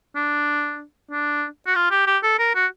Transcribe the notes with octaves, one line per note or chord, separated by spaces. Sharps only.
D4
D4
F#4
F4
G4
G4
A4
A#4
F#4